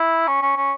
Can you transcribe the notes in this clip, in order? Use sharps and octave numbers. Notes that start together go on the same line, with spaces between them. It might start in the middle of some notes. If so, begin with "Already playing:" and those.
Already playing: E4
C#4
C#4
C#4